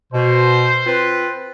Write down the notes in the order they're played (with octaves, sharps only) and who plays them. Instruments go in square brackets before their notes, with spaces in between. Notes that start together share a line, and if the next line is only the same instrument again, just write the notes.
[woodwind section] B2 [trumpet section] C5
[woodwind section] C4 F4 B4